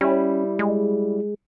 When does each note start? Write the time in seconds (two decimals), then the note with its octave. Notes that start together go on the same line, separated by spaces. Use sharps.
0.01 G3 C#4 E4
0.59 G#3